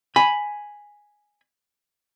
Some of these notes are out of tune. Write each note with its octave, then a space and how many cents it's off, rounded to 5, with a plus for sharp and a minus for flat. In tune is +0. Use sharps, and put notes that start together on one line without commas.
G#5 +0 B5 +0